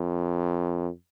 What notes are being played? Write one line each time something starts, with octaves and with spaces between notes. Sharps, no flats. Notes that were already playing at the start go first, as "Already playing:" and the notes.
Already playing: F2